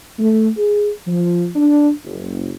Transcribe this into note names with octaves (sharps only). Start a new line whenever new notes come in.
A3
G#4
F3
D4
F#1